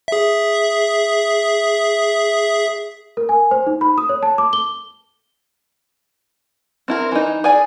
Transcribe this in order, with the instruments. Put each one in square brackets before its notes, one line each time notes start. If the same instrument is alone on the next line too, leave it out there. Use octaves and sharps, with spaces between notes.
[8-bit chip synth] G#4 E5
[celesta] A#4
G#5
C5
D#4
B5
D#6
C#5
A5
D6
G7
[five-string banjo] C4 E4 A#4
E3 D#4
G#4 D5 G#5